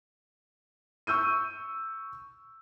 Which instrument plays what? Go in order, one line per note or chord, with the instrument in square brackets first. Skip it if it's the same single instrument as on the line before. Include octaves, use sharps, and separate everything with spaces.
[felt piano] C#6 E6 G6 D#7